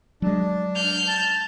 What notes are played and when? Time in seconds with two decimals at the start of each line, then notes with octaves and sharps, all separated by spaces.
0.22 F#3 G#3 D4
0.76 F6 G6
1.08 A5